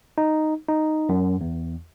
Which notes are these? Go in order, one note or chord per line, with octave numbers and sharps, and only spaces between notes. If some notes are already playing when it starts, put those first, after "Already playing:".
D#4
D#4
F#2
E2